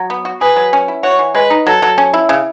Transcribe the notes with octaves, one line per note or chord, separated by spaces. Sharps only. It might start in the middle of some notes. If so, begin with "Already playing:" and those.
Already playing: F#3
B3
F#4
G#4 B4
F#3
C#4
E4
F#4 C#5
E3
G#3 B4
D#4
F#3 A4
F#3
C#4
E4
C#3